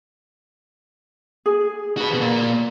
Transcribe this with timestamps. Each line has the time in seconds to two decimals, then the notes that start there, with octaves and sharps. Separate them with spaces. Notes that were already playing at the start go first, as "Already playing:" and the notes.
1.46 G#4
1.97 F#4 B4
2.09 D#2 B2
2.21 A#2